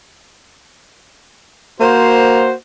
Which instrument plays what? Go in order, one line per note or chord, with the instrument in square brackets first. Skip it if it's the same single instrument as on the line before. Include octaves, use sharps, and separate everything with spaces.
[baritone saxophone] A#3 [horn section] F#4 C5